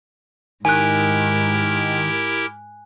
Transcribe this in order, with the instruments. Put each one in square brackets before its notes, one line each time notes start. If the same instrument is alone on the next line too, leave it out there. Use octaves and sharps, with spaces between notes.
[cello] G#2 [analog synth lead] D#3 [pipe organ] E4 G4 A#4 [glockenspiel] G#5 F#6